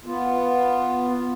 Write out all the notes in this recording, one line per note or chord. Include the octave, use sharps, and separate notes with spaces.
B3 F4